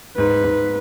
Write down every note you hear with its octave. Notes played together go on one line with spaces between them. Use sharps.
G#2 B4
G#2